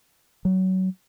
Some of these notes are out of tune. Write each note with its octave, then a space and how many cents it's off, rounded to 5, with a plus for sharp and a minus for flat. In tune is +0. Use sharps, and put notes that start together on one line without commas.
F#3 +20